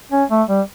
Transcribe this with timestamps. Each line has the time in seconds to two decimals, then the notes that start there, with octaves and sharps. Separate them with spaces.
0.11 C#4
0.30 A3
0.49 G3